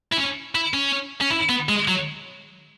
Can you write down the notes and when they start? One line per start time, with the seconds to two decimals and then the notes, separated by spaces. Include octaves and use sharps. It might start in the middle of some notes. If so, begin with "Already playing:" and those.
0.12 E4
0.17 C#4
0.55 E4
0.74 C#4
1.21 C#4
1.30 E4
1.49 B3
1.69 G#3
1.88 F#3